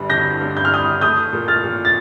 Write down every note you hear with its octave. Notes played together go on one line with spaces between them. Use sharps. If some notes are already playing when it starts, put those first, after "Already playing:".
Already playing: G1 G2 G3
D3 G6 A#6
G2
G6
F6
G3 D#6 G6
A3 D#6 G6
A#2
F6 A6
A#2
A6